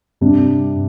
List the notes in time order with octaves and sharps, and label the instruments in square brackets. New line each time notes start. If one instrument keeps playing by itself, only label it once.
[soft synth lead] G2 [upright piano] C3 G3 D4